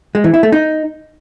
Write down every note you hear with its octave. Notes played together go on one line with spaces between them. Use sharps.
G#3
E3
E4
A3
D#4